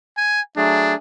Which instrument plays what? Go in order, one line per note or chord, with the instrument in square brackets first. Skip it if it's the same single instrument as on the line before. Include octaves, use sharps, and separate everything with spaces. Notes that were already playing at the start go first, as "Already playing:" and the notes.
[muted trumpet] G#5
[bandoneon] F#3 A3 G#4 [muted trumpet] D4